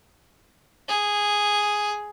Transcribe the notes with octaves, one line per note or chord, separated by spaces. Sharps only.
G#4